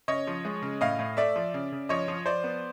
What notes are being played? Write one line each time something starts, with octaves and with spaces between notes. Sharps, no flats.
C#3 C#5 D#5
F3
G#3
C#3
A2 D#5 F5
A2
A3 D5 E5
F3
C#3
C#3
F3 C#5 D#5
F3
F3 C5 D5
B3